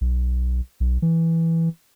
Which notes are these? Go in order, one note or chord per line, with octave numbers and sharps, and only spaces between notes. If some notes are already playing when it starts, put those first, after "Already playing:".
B1
B1
E3